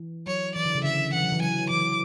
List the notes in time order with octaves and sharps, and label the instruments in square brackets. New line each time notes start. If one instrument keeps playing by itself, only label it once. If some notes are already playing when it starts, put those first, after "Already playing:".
Already playing: [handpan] E3
[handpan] F#3 [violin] C#5
[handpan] E3 [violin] D5
[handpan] D3
C#3
[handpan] D3 [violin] E5
[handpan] E3 [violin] F#5
[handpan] F#3
E3
[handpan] F#3 [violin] G#5
[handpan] E3 [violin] D6